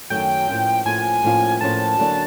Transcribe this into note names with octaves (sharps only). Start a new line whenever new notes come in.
F#2 D#3 F#3 A3 G5
A2 F3 A#3 C#4 F4
A2 F3 A#3 C#4 F4 G#5
A2 F3 A#3 C#4 F4
A2 F3 A#3 C#4 F4 A5
D3 F#3 A#3 D4